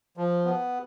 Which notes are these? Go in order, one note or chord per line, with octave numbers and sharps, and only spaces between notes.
F3
B3